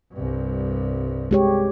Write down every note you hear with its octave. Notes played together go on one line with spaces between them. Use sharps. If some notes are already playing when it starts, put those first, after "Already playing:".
C2 G2
G#3 G4 C#5